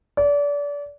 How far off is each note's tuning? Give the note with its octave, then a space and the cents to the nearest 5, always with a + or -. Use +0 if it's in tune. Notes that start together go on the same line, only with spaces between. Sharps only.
D5 -30